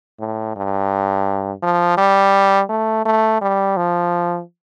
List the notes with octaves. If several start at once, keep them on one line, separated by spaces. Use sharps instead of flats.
A2
G2
F3
G3
A3
A3
G3
F3